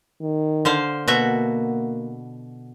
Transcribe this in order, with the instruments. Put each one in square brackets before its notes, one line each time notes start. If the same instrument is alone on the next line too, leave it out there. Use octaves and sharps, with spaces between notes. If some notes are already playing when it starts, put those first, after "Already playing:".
[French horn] D#3
[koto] D3 C5 F5
[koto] B2 F#4 E5 [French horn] A#3